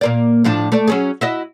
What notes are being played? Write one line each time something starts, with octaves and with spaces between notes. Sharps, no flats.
A#2 A#3 D5
A2 F3 D4
A3 D5
F#3 C#4 G#4
E4 F#4 D#5